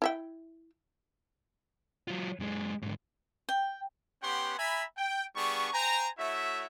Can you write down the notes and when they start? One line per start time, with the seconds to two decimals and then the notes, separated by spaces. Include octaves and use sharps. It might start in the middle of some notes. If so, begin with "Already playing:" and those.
0.02 E4 E5 G5
2.08 F#3 F4
2.40 F#2 G#3
2.82 G#2 D3
3.49 G5
4.22 B3 C#4 G4 F#5 G5 C6
4.58 E5 G#5 A#5 B5
4.96 G5
5.36 G3 B3 D4 G#4 C#6
5.73 C5 G5 G#5 A#5
6.17 A3 E4 F#4 C#5 E5